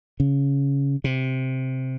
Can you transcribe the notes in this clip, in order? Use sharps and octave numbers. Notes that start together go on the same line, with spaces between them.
C#3
C3